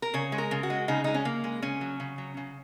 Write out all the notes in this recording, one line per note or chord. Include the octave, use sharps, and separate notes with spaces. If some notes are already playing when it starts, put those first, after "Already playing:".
A#4
C#3 C#5
G#3
A#4
C#3
F#4
G#3
C#3 D#4
G#3 D#4
C#4
C#3 A#3
G#3
C#3 C#4
F#3
C#3
F#3
C#3